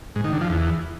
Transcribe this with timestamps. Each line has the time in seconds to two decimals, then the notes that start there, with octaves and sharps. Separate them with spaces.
0.16 G#2
0.24 D#3
0.33 D3
0.41 F3
0.50 E2